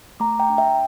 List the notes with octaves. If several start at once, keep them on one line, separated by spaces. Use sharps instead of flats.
A3 A#5 D6
G5 A#5
D4
E5 G5